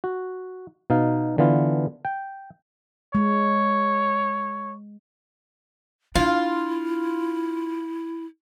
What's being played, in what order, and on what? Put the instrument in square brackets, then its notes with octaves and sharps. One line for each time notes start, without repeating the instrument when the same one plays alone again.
[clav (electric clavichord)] F#4
B2 D#4 F5
D3 E3 B3 F4
G5
[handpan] G#3 [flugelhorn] C#5
[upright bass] D4 [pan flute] E4 [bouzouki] F4